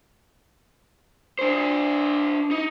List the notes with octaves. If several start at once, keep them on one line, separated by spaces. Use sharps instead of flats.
D4 C5
D#4